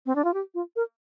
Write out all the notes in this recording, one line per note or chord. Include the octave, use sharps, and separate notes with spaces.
C4
D4
F4
G4
F4
A#4